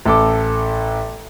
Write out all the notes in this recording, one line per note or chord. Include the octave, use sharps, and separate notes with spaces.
A1 A4 D6